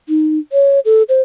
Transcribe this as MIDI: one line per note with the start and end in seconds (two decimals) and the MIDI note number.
0.09 0.39 63
0.52 0.80 73
0.85 1.03 69
1.09 1.22 72